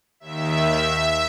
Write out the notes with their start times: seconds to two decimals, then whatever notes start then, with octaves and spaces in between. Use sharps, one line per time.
0.20 D#2 D#3 E5